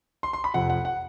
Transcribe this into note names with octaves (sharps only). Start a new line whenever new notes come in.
C6
C6
B5
F2 C3 F3 F#5
F#5
F#5